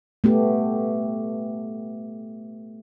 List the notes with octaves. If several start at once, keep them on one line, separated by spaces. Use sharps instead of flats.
A3 B3 G4